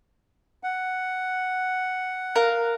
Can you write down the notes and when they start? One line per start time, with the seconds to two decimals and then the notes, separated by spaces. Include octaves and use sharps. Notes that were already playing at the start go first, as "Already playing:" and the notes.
0.63 F#5
2.35 A#4 F5 F#6